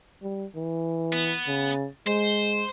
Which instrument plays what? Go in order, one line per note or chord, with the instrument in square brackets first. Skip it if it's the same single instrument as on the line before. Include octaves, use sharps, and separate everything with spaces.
[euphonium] G3
E3
[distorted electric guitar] B3
[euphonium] C#3
[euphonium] G#3 [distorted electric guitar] C5